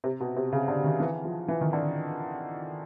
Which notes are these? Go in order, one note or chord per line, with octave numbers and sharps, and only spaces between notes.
C3
B2
C3
C#3
D3
D#3
E3
F3
E3
D#3
D3